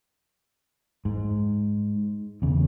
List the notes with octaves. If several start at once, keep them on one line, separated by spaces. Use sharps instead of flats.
G#2
E2 C#3